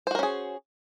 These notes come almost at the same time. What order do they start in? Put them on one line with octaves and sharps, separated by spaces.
C5 F#4 A#4 C#4 G#4